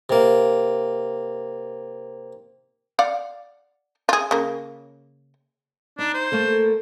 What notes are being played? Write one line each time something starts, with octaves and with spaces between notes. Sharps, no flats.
C3 A#3
D5 F5 F#5
F4 G#4
C#3 A#3
D4 D#4
C5
A3 A#3 A4